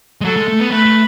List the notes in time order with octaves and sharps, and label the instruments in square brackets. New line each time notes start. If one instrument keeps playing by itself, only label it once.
[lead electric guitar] G#3
[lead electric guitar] F#3 [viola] A4
[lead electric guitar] G#3
A3
B3
[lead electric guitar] A3 [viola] B4
[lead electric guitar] A3